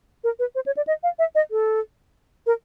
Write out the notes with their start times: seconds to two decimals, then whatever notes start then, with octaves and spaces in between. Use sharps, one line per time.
0.24 A#4
0.39 B4
0.55 C5
0.66 C#5
0.77 D5
0.87 D#5
1.03 F5
1.19 E5
1.35 D#5
1.51 A4
2.46 A#4